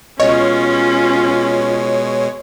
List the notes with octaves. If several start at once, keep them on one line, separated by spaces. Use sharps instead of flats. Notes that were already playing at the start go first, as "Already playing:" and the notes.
B2 G#3 C#4 F4 C#5 D#5